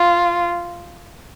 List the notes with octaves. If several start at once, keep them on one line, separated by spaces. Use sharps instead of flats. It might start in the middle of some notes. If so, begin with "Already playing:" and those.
Already playing: F4